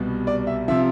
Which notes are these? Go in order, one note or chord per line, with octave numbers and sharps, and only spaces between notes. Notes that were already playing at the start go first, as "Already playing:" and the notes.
Already playing: C2 B2 G3
D5
E5
C3 F3 E5